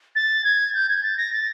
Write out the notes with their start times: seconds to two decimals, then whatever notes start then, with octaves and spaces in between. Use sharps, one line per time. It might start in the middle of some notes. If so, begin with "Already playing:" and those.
0.15 A6
0.44 G#6
0.74 G6
0.89 G#6
1.03 A6
1.17 A#6
1.33 A6